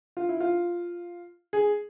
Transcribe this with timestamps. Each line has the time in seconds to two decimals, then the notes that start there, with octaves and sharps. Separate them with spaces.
0.17 F4
0.29 E4
0.40 F4
1.53 G#4